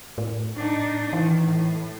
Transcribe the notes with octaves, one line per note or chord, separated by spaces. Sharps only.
A2
D4 D#4
D#3 E3
A2